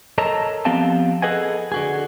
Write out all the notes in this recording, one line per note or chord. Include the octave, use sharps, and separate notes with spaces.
A4 A#4 C#5 D#5 A5 A#5
F3 B3 C4 G4 F5 A5
G#4 A4 B4 D#5 F#5 G#5
D3 F#4 G#4